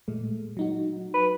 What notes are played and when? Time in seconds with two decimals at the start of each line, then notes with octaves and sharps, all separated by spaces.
0.08 A#2 G#3 A3
0.57 F#3 D#4 F#4
1.14 B4